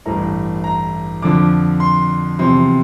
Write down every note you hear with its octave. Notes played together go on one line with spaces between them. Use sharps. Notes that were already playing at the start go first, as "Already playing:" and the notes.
A1 G2 E3 A3 A#5
A#5
F2 D3 F3 D6
C6
E2 C3 F3 C6